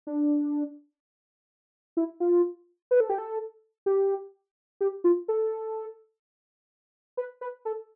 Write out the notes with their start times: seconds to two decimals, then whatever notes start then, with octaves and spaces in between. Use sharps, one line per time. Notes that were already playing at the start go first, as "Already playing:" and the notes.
0.07 D4
1.97 E4
2.20 F4
2.91 B4
3.00 A4
3.10 G4
3.18 A4
3.86 G4
4.81 G4
5.04 F4
5.28 A4
7.17 B4
7.41 B4
7.65 A4